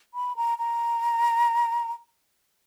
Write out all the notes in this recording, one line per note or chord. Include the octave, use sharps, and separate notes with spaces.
B5
A#5
A#5